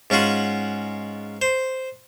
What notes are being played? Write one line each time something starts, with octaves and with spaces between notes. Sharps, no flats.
G#2 C#4 F4 F#4 F#5
C5